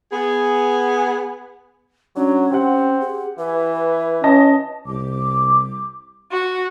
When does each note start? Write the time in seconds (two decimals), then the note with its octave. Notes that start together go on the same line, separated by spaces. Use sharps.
0.12 B3 G#4
2.16 F#3 C#4 D4
2.51 C4 G4 F#5
3.01 G#4
3.39 E3 B4
4.24 C#4 D#5 A5 A#6
4.87 C2 D6
6.32 F#4